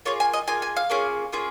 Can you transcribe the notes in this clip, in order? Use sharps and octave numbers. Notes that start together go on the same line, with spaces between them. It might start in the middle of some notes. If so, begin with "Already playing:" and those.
A#3 F4 G#4 C#5
G#5
D#5
A#3 F4 G#4 G#5
G#5
F5
A#3 C#4 F4 G#4
A#3 C#4 F4 G#4